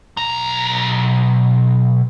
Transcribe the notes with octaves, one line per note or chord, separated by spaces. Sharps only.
B1 A#5